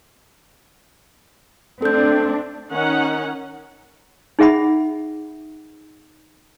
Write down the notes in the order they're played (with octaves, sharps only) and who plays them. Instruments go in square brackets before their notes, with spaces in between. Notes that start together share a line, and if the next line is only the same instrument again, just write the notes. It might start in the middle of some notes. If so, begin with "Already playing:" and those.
[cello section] A3 C4 D4 [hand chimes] A4 G6
[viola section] D#3 C#4 D#4 F#5
[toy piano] D#4 G#4 E5 F#5 B5